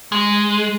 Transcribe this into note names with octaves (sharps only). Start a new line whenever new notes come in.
G#3